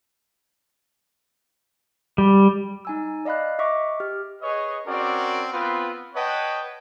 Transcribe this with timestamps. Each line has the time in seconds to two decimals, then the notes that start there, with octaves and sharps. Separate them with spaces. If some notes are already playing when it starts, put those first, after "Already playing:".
2.18 G3
2.85 D#4 G#5 E6
3.25 D5 D#5 F5 B5 F#6
3.59 D#5 E5 C#6 D6
4.00 G4 F6
4.42 G#4 B4 C#5 D#5
4.86 C4 C#4 F#4 A#4 D5
5.53 B3 C4 F4 B4
6.15 B4 C#5 D#5 F#5 G5 A5